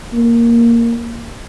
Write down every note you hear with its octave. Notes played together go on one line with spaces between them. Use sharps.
A#3